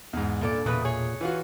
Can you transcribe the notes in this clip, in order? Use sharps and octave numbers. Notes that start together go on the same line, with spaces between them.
E2 G#2
G2 A#2 A4 D5
E1 E2 A#2 C#3 B4 D#6 F#6
G#4 C#5
E3 F4 F#4